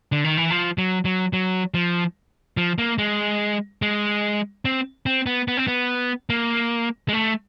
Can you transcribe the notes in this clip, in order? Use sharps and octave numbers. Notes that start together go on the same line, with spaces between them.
D3
D#3
E3
F3
F#3
F#3
F#3
F3
F3
A#3
G#3
G#3
C4
C4
B3
B3
C4
B3
A#3
G#3
A3